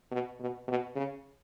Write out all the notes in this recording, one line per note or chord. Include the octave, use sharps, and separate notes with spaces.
B2
B2
B2
C#3